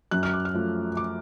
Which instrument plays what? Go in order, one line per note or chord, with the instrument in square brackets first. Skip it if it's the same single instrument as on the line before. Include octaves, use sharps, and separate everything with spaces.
[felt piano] F#2 F#6
F6
D6
F6
F3 A3
D6